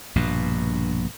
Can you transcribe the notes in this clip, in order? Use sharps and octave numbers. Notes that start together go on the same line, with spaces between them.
A#1 G2 B2